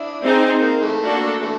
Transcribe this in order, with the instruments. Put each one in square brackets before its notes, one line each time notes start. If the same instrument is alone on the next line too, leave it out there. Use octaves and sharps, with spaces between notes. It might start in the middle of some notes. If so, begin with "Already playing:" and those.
Already playing: [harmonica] D4 E4
[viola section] C4 D#4 G#4 C5
[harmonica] A#3
E3 A3
[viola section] A#3 D4 F#4 A4
[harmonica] E3 A3